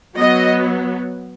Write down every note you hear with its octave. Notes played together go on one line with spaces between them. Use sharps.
F#3 B3 D#5